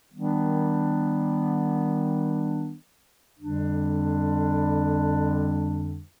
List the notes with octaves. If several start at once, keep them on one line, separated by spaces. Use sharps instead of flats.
D#3 G3 B3 D4
F2 D3 G3 D4